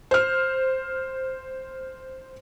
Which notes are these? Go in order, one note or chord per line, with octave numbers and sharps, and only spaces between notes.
C5 F6